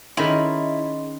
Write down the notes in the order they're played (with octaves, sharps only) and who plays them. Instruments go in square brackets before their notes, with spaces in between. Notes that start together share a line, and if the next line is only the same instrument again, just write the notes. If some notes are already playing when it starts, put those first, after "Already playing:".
[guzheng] D#3 C#4 [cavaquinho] E4 [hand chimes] G#4 D#5 C6